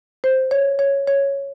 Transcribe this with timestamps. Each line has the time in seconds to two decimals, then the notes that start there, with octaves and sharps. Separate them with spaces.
0.24 C5
0.51 C#5
0.79 C#5
1.08 C#5